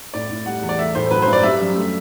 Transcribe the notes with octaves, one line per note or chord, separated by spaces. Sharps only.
A2 D5
A2
G3 F#5
E2
D5
A3 E5
A2 C5
F#3 B4
G2 C5
D5
G3 E5
F#2
A3